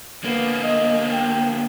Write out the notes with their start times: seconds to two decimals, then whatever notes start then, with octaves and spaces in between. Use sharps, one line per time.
0.24 D3 A#3 B3
0.63 D#5
1.12 G5